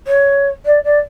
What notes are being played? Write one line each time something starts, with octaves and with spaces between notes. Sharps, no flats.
C#5
D5
D5